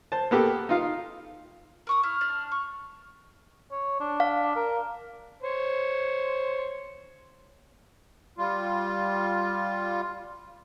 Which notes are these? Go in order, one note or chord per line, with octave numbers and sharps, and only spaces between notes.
C5 A5
A#3 B3 G4 A4
D#4 F4 F5
A#4 C#6 D#6
E4 F6
D4
C#6
C#5
D4
F5
A#4
C5 C#5
G3 F4